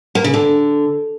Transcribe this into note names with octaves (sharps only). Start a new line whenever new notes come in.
A#3
C#3
D3